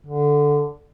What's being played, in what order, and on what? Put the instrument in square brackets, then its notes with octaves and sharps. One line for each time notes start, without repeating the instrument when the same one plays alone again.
[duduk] D3